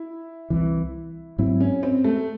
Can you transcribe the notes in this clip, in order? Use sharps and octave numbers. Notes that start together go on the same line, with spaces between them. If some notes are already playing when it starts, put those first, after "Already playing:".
Already playing: E4
C2 C3 E3
G#2 F#3 C4 E4
C#4
C4
A3